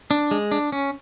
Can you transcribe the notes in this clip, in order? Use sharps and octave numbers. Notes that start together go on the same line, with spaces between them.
D4
G#3
D4
C#4